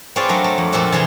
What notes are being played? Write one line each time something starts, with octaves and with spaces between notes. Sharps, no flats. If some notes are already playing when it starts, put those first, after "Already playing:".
C4 F4 G#4 B4 C#5 D5
F#3 A3 D4 A#4
A3
F2
A#2 F3 C4 D4 A4 F#5
C3 E3 G#4 E5 G#5 C6